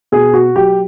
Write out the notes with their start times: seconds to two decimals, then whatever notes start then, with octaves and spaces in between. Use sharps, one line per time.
0.12 B2 G#4
0.34 F#4
0.55 F#3 G4